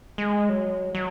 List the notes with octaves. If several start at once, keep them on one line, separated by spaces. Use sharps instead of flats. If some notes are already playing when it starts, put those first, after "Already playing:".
G#3
F#3
F#3